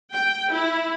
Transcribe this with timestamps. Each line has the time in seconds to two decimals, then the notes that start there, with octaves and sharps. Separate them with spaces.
0.12 G5
0.52 E4